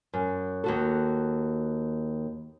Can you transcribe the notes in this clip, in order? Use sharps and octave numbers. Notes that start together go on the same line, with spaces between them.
F#2
D#2 F#4 A4